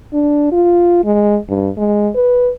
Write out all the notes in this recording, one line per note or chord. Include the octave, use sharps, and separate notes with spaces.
D4
F4
G#3
G2
G#3
B4